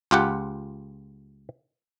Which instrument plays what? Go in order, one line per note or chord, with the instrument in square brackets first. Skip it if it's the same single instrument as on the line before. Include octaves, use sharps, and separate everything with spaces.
[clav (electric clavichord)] C#2 F4 G4 F#5